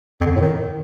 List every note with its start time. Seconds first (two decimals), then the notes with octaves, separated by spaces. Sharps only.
0.21 F2
0.26 D3
0.31 F2
0.36 A2
0.41 D#3